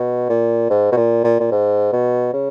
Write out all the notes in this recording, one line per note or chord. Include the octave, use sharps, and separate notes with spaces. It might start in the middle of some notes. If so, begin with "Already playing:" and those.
Already playing: B2
A#2
G#2
B2
A#2
A#2
A#2
G#2
B2
C#3